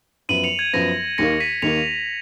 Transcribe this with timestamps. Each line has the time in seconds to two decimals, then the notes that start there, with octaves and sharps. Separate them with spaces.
0.29 F#2 F3 B3 D#7 F#7
0.44 C#7 F7
0.59 G#6
0.73 F#2 F3 B3 A#6
1.18 D#2 D#3 A#3 A#6 C#7
1.40 B6 D#7
1.62 D#2 D#3 A#3 C#7 F7